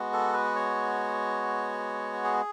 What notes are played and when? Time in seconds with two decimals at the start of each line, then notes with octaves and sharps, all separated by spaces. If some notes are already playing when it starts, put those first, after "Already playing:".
Already playing: G#3 B3 F#4
0.13 A4
0.34 B4
0.55 C#5
2.24 G#4